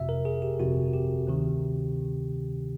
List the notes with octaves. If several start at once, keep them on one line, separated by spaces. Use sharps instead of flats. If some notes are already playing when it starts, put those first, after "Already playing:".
Already playing: G1 F2 C3 E5
A#4
G#4
G4
G1 F2 C3 F#4
G4
D2 C3 D#3